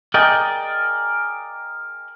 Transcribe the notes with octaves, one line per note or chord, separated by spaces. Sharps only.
G#4 A#4 D5 D#5 G5